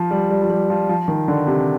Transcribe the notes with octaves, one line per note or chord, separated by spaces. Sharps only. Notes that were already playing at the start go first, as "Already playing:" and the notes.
Already playing: F3
G3
G3
F3
G3
F3
F3
D#3
D3
C3